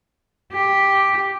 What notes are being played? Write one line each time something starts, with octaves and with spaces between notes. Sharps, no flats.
G4